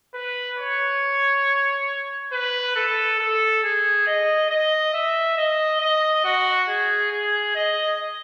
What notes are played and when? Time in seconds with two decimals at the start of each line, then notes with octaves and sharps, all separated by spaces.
0.14 B4
0.59 C#5
2.32 B4
2.76 A4
3.19 A4
3.63 G#4
4.07 D#5
4.50 D#5
4.94 E5
5.37 D#5
5.81 D#5
6.24 F#4
6.68 G#4
7.11 G#4
7.55 D#5